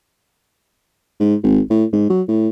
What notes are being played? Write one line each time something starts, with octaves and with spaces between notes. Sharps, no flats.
G#2
G#1
A2
G#2
F#3
A2